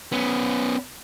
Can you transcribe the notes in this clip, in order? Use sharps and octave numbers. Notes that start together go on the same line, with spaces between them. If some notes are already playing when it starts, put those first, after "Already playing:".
B3 C#4